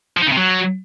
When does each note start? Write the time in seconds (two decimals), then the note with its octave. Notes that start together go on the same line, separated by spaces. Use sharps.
0.17 F3
0.22 D#4
0.27 C#3
0.32 C3
0.37 F#3